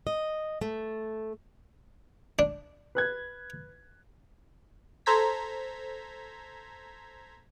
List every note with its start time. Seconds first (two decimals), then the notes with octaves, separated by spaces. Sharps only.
0.07 D#5
0.61 A3
2.39 D4
2.95 B4 F#6 G#6
5.06 A4 C5 A#5 G#6 B6